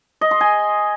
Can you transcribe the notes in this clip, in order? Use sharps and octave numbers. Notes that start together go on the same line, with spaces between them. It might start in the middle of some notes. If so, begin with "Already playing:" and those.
D#5
C6
G#5